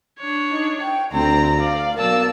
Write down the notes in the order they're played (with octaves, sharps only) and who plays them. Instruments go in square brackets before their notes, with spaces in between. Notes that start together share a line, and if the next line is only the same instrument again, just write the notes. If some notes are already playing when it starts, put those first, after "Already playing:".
[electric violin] D4 C#5
[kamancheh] D#4
G5
[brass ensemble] D2 [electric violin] C4 [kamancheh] D5 A#5
[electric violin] D5 [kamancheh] F5
[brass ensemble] B1 [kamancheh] A#3 D5 [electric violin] A5 E6